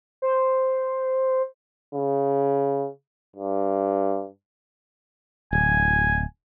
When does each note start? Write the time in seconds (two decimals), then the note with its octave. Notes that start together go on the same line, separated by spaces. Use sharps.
0.22 C5
1.94 C#3
3.36 G2
5.53 D1 G#5